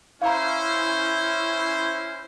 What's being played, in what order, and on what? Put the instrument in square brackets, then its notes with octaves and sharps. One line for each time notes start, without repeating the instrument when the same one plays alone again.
[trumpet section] C#4 C5 [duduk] E4 [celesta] F5 A#5